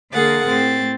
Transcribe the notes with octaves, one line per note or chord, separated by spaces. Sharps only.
D3 A#3 G#4 A#4 F#5 A6
A2 C4 A6